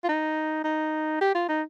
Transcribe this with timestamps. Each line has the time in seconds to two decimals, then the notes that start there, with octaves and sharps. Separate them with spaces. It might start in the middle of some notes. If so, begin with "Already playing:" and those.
0.04 F4
0.09 D#4
0.64 D#4
1.21 G4
1.35 F4
1.49 D#4